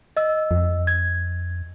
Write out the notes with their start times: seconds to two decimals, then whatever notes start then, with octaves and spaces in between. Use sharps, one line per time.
0.17 D#5 E6
0.51 F2
0.87 G#6